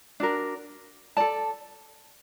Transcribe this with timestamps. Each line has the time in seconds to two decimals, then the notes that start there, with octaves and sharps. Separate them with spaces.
0.20 D4 F#4 A#4
1.17 A4 D5 A5